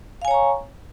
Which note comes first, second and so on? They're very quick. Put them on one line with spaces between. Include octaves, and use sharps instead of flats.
F5 G#5 C#5 A#5 C#6